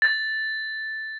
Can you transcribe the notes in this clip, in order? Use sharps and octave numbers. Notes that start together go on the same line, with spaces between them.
A6